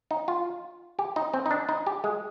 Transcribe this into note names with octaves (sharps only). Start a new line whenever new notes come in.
D#4
F4
G4
D#4
C4
D#4
D4
D#4
G4
G#3